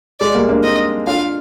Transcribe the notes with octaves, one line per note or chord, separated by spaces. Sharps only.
G#3 D5
G3 A#3
A#3 D4
C4 D#4 D#5
D4 F4 F5